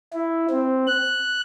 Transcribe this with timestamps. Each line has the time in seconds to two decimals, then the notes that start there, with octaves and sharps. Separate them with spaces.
0.13 E4
0.50 C4
0.87 F#6